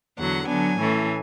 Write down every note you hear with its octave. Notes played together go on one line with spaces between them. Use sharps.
E2 D3 F#3 F#5
D3 F#3 B3 D4 G#5
A2 E3 A3 C#4